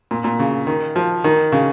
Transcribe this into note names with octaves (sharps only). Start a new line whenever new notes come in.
A#2
A#2
C#3
D#3
F3
D#3
C#3